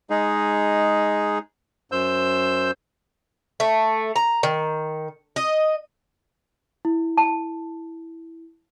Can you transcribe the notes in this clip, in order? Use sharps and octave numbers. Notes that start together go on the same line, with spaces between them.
G#3 D#4 G#4
F#2 C5 E6 G6
A3
A#5
D#3
D#5
E4
A5